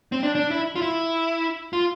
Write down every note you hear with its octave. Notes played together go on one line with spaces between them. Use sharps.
C4
D4
D4
E4
F4
E4
F4